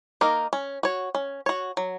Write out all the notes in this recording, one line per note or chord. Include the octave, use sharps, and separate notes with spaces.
A#3 D#4 A#4
C#4
F#4 C#5
C#4
F#4 C#5
F#3